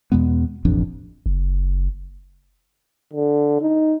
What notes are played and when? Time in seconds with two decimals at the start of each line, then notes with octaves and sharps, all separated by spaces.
0.12 E2 B2 G#3 B3
0.65 E1 A1 F2 D4
1.26 F#1
3.13 D3
3.62 D#4